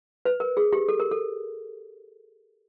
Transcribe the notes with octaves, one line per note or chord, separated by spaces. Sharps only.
B4
A#4
G#4
G4
A4
A#4
A4